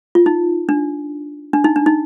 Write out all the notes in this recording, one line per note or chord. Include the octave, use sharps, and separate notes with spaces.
F4
D#4
D4
D4
D#4
D4
D#4